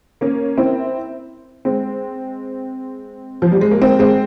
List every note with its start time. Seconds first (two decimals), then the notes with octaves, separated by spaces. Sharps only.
0.21 A#3 C#4
0.57 C4 E4
1.65 G#3 C4
3.42 F3
3.52 G3
3.61 G#3
3.71 A#3
3.82 G#3 C4
3.99 G#3 C4